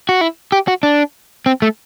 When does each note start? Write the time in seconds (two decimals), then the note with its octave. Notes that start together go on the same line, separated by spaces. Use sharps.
0.09 F#4
0.21 E4
0.52 G4
0.68 F#4
0.83 D4
1.46 C4
1.62 A3